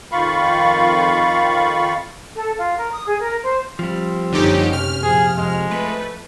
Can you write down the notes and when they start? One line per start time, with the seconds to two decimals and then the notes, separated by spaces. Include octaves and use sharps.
0.12 F2 D#3 F4 F5 B5 C#6
2.35 A4
2.58 F4
2.78 A#4
2.92 D#6
3.07 G#4
3.21 A#4
3.42 C5
3.79 F3 G3 C4
4.32 F#1 G2 D3 C#4 D#4 G4
4.73 C3 G4 F6
5.03 A#2 F3 G#4
5.37 F2 G#3
5.71 A3 B4